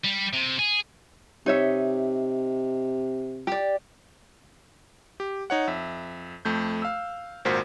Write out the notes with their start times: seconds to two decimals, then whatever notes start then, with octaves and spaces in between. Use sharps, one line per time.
0.04 G3
0.33 C3
0.59 G#4
1.46 C3 D#4 C#5 E5
3.47 G4 D5
5.20 G4
5.50 D#4 C#5 F#5
5.68 F2 E5
6.45 F2 A3 G6
6.82 F5 E6
7.45 G#1 A#2 F#4 A#4 C5 B6